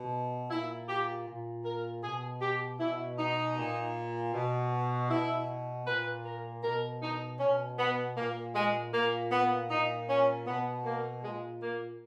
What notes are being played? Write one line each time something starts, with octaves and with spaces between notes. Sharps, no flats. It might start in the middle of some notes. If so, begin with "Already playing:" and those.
Already playing: B2
A#2 E4
G4
A#2
A#4
B2 G#4
G4
B2 E4
D#4
A#2
B2
B2 E4
A#2 B4
A#4
B2 A#4
D#4
B2 C#4
B3
A#2 A#3
G#3
A#2 A#3
B3
A#2 D#4
C#4
B2 B3
A#3
A#2 G#3
A#3